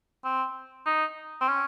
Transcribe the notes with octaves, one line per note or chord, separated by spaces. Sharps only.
C4
D#4
C4
C#4